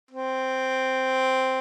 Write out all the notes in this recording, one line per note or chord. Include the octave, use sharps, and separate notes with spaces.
C4